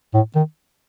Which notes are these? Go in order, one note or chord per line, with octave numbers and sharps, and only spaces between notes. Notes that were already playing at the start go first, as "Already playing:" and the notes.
A2
D#3